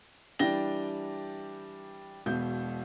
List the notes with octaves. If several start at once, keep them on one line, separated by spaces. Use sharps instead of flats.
E3 G3 D4 G5 A#6 G7
E1 B2 G6